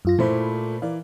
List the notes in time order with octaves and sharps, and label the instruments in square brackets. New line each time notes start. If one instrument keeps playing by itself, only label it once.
[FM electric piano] F#2 F4 A#6
[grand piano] A#2 A3 A#3 [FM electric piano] E4 C5 B5
[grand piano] E3 [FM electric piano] A#4 D5 F5